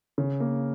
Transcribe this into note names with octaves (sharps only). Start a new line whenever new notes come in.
C#3
A#3